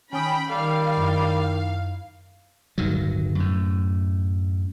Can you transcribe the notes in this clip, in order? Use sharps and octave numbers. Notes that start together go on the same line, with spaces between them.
D#3 C#4 G5 A5 B5 D#6
D#3 G3 A4 F5
F#2 D#4 E4
D1 G1 D#3 F#3
F#2 A2